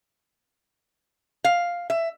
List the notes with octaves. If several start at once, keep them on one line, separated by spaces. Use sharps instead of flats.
F5
E5